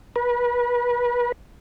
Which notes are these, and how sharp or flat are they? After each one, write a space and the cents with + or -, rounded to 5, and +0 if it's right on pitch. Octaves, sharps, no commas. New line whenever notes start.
B4 -30